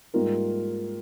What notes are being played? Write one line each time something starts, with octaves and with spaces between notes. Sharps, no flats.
G#2 G3 A#3 F4 A#4